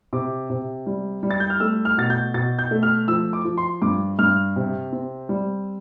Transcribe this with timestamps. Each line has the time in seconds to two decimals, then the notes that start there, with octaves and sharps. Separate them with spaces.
0.13 C3 D6
0.50 C3
0.87 G3
1.23 G3
1.31 A6
1.40 G6
1.50 F6
1.60 A3 E6
1.85 F6
1.97 B2 A6
2.10 G6
2.34 B2 A6
2.59 G6
2.71 A3
2.83 F6
3.08 F3 E6
3.33 D6
3.45 F3
3.58 C6
3.82 G2 D6
4.19 G2 F6
4.56 C3
4.92 C4
5.29 G3